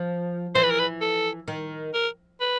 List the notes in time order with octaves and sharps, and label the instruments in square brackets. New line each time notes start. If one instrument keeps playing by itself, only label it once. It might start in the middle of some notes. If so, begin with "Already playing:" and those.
Already playing: [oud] F3
[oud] E3 [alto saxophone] C5
[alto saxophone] B4
A#4
B4
A4
[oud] D#3
[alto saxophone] A#4
B4